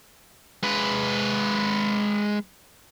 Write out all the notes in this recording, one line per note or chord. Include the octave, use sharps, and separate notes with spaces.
G#3 B4